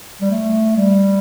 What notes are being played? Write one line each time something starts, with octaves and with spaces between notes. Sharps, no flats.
G3
A3
G3